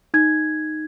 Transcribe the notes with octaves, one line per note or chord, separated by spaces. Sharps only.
D#4 G#6